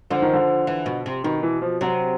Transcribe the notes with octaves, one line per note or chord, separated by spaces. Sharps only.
D3 F3
D#3
D3
E3
B2
C3
B2 D#3
E3
F3
C3 F#3